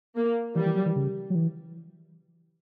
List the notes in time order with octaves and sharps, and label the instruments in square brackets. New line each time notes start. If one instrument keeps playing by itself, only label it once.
[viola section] A#3
[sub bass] E3 [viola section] G3
[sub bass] E3
F#3
E3
C#3
F#3
E3